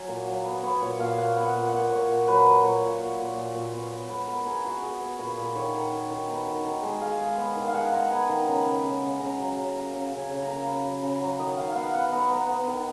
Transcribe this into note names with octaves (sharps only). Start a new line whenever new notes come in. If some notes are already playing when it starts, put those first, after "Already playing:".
Already playing: F#3 G#5
A#2
F#3
B3
B3 C#5
A#2 C#5
A#2 F5
A#2 F#5
B3
F#5
A#2
F#5
A#2
A#2 C#5
A#2
F#3 B4
F#3
A#2 C#5
A#2
A#2
A#2
A#2
A#2
B3
B3
G#3 B4
B3 A#4
B3 G#4
B3 F#4
B3 G#4
B3
A#2 B4
A#2
D#3 C#5
D#3
D#3
D#3
B3
D#3
D#3
G#3
G#3 F5
G#3
B3
D#3
F5
G#3 F#5
G#3 A#5
B3 G#5
D#3 A#5
C#3 B5
C#3
C#3
C#3
C#3 A#5
F#3
C#3
A#5
A#3
C#3 A#5
C#3
G#5
C#3
A#5
A#3
C#3 B5
F#3
C#3 A#5
F#3
D#3 D#5
D#3 F5
B3 F5 F#5
B3 F#5
B3 A#5
B3
B3
D#3